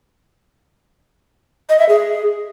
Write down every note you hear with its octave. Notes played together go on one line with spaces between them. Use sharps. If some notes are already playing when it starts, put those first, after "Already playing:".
D#5
E5
G#4